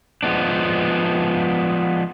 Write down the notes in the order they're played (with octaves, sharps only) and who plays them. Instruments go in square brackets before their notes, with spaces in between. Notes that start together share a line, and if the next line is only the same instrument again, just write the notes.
[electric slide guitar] F3 G#3 B3 D4